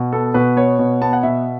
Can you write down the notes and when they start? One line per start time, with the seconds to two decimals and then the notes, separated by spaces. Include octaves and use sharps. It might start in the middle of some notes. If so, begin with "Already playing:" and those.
Already playing: B2
0.13 B3 A4
0.34 B2 B4
0.56 B3 C#5
0.79 B2
1.01 B3 A5
1.13 F#5
1.23 B2 E5